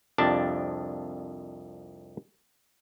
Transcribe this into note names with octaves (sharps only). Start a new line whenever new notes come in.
C2 F2 F3 D4 G4 A5